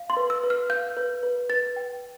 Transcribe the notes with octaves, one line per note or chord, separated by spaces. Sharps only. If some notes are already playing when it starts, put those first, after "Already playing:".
Already playing: F5
C6
B4
E6
B4
F6
F5 G6
B4
B4
B4 A6
G5